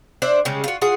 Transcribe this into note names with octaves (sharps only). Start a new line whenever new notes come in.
D4 C5 D5 E5
C#3 G3 G#3 C#4
F4 F#4
F4 F#4 G#4 F#5